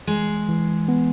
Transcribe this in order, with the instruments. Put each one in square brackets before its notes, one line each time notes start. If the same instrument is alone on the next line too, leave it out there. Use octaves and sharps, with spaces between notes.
[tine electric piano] E3 [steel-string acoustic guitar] G#3
[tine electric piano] E3
B3